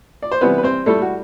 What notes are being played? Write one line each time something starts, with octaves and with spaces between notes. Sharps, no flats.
D5
C5
C3 E3 G3 B3 B4
B4
C4 C5
A2 G3 A3 A4
F#4